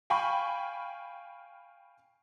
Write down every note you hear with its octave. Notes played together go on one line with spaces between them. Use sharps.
F5 G5 G#5 B5 C#6